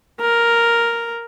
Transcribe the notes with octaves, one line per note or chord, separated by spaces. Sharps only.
A#4